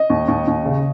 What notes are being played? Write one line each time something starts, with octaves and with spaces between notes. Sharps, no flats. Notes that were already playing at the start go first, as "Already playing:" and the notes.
Already playing: D#5
D#2
D#2
D#2
C#3